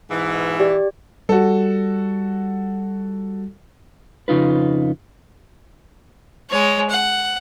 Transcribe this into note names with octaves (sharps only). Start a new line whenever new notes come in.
G#2 B2 E3
G4 D5
G3 F#4 A4
F2 C#3 D#4 F4 B4
G#3 C#5
F#5